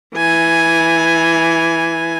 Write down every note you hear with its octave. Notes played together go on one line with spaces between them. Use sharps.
E3 G#5